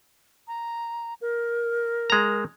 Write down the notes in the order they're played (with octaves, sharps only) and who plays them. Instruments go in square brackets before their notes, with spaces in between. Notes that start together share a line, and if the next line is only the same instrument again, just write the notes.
[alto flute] A#5
A#4
[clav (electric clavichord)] G#3 A#5